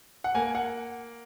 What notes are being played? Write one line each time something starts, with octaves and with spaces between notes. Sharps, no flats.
F#5
A#3 G#5
F#5